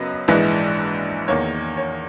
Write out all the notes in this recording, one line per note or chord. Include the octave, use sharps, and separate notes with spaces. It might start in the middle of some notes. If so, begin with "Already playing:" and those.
Already playing: F#2 C#3 F#3 B3 B4 D#5
A#1 G#2 E3 G#3 B4
E2 D#3 A#3 C#5
C#5